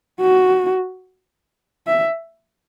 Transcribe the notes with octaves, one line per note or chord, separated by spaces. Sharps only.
F#4
E5